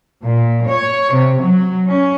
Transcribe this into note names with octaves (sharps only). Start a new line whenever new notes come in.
A#2
C#5
C3
F#3
C#4